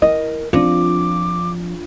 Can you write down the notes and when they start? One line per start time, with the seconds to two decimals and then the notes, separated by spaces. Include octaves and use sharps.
0.02 E4 A#4 D#5
0.53 F3 C4 D4 F4 D6